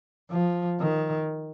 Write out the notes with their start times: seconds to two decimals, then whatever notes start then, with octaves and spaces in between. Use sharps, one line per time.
0.31 F3
0.80 D#3